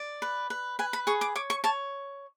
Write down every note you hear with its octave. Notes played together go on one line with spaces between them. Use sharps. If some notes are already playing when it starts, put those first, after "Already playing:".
Already playing: D5
B4
B4
B4 G#5
B5
G#4 C#6
D6
C#5 D6
C#6
C#5 A5